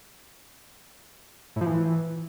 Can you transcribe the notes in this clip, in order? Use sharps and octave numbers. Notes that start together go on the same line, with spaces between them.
A2
F3
E3